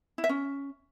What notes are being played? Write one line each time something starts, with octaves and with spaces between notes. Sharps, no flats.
E4
E5
C#4